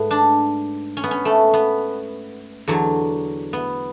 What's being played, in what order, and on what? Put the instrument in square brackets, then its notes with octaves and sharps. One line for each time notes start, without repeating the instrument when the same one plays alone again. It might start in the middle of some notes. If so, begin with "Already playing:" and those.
Already playing: [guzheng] G#2 A3 B3
D4
C#4
B3
C#4
A3
B3
E2 D3 F#3
B3